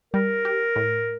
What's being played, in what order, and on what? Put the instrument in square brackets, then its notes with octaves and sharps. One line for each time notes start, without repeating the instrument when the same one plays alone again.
[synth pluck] G3 [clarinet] A#4
[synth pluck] G4
A2